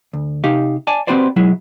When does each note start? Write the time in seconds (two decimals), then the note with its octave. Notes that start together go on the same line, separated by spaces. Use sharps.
0.13 D2
0.44 C3 D#4 G4 F5
0.87 D5 G#5 A5
1.07 C4 F#4 G4 B4 C5 D5
1.36 B1 F#3 G#3 E4